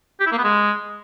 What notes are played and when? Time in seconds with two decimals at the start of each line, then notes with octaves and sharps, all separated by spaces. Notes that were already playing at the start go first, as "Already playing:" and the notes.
0.20 G4
0.26 E4
0.32 A#3
0.38 B3
0.44 G#3